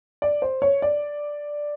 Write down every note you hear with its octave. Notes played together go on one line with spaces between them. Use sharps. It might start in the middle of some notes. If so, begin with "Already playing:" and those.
D5
C5
C#5
D5